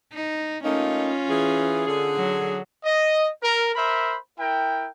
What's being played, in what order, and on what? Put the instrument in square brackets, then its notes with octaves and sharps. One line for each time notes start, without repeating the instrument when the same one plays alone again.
[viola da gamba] D#4
[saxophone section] A3 A#3 D#4 [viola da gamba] C#4 F4
[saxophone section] E3 G#4
D3 G#4
[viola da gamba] F#3
[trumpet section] D#5
A#4
A#4 C5 E5 B5
E4 A#4 G5